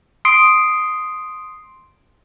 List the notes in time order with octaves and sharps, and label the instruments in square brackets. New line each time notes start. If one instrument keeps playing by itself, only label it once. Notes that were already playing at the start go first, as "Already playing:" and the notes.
[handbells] C6 D#6 C7 D7